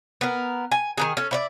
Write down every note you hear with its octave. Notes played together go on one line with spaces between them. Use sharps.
B3 A#4
G#5
D#3 F#3 G#4
C#4 A4
E4 C#5 D5